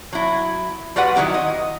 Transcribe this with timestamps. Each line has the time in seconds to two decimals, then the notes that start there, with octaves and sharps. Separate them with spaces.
0.13 F#3 E4
0.96 G3 F4 F#4 B4 F#5
1.15 D#3 F#3 E4 G4
1.34 D#5